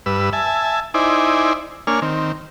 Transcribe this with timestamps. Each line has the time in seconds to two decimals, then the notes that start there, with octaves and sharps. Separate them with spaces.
0.06 G2 B4 E6
0.33 E5 G#5 A5
0.94 D#4 E4 C5 D5 G#5
1.87 A#3 D4 C#5 G#5 F6
2.02 D#3 C4